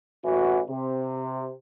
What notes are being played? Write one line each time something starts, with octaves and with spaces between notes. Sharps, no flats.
A1 E3 F#4
C3